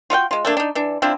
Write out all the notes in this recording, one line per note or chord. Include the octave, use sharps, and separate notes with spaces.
F4 F#4 F5 G5
G#3 F4
A3 A#3 D4
D4 D#4
E3 D4
C4 D4 E4 F4